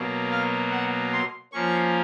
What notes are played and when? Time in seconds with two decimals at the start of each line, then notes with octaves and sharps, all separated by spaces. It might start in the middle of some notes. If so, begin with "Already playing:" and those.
Already playing: B2 F#3 A#3
0.31 F5
0.71 F#5
1.13 C6
1.52 F3 A#3 C#4 C#6